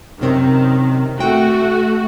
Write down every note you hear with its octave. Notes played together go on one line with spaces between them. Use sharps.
F#2 C3 D#3 C4
A3 F#4 G5